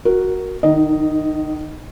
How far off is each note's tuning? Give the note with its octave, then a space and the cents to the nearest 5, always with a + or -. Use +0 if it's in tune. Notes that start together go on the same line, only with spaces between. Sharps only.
F#4 +0 A#4 +0
D#3 -25 D#4 +20 D#5 +0